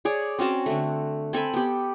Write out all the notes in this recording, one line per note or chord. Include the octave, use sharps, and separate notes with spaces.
G#4 C#5 D5
C4 C#4 F#4 A5
D3 A3
C4 A4 G#5 B5
B3 G4